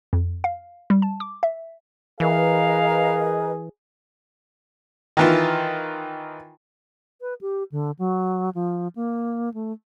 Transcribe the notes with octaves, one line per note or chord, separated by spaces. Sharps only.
F2
F5
G3
A5
D6
E5
E3 G#4 A#4 B4 D#5 F5
D#3 E3 F4
B4
G4
D3
F#3
F3
A#3
A3